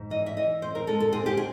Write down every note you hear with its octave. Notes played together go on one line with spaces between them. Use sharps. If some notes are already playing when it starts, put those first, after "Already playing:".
Already playing: G#2
E3 D#5
E5
E3 D#5
C4 C5
A#4
G#3 A4
A4
C4 G#4
G4
G#4